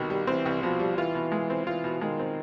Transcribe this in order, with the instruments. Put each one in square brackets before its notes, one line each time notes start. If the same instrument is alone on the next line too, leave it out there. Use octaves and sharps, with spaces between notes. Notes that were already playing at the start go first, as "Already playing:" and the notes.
Already playing: [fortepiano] C2 B2 [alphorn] D#3
[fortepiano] G3
[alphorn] E3 [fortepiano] C4
[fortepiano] C2
[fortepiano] B2 [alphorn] F3
[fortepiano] G3
[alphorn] E3 [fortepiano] F4
[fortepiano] B2
G#3
C4
[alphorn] E3 [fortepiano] F4
[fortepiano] B2
[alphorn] D#3 [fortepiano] G#3
[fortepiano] C4